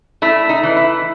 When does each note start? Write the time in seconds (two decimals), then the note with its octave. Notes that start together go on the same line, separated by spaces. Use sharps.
0.22 A3 E4
0.49 D#4
0.63 E3
0.76 E4